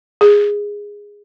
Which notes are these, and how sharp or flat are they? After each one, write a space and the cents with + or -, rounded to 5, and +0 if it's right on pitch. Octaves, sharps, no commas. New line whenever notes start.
G#4 -15